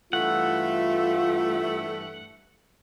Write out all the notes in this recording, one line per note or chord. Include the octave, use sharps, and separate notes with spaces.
G2 E3 A3 F4 F#5